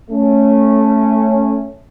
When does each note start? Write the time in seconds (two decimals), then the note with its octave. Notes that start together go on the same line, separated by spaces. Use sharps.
0.11 A3 C#4